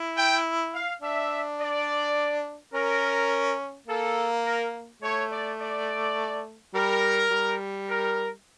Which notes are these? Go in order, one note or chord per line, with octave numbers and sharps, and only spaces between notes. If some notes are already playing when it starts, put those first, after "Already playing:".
Already playing: E4
G5
F5
D4 E5
D5
C#4 A#4
A#3 A4
A#4
A3 C#5
D5
D5
G3 A#4
G3
A#4